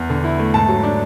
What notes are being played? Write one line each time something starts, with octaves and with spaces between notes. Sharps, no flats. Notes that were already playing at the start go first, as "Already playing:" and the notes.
Already playing: E2
D3
E4
A3
G#2 A5
F#3
D4